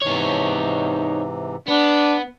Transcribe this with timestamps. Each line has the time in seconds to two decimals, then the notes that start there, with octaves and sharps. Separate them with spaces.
0.02 G#2 C3 E3 D#4 C#5
1.68 B3 D4